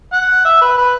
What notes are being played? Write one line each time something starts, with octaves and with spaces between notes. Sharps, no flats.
F#5
E5
B4
B4